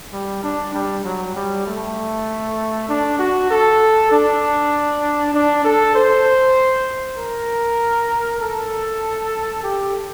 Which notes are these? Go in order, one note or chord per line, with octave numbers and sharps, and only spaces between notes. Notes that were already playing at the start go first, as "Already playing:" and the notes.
G3
D4
G3
F#3
G3
A3
D4
F#4
A4
D4
D4
A4
C5
A#4
A4
G4